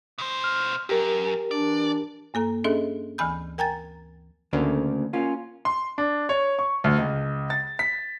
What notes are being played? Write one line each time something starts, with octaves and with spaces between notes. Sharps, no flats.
B2 C5
F6
F#2 G4 A#4
E3 D4 D5
G2 A#3 A4 A#5
C#4 D4 G#4 A4 D#5 E5
D2 E3 G#5 B5 G6
A#4 G5 G#5 A#5 G#6 A6
D2 C#3 A#3
A#3 C#4 F4
C6
D4
C#5
C#6
D2
C#2
A6
B6